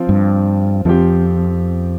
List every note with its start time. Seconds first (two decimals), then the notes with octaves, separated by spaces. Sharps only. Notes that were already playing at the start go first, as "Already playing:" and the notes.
Already playing: F3 C4 F4
0.09 G2
0.85 F2 F3 C4 G4